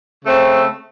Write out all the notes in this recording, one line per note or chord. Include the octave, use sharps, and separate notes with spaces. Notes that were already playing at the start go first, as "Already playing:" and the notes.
C#3 A3 C4